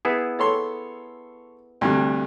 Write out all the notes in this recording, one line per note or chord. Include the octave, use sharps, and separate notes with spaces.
B3 E4 G#4
A4 C#5 C6
D2 G2 C3